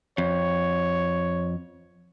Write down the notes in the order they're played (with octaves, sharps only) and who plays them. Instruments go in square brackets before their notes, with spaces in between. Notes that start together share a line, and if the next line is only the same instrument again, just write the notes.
[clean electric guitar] F2 [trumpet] C#5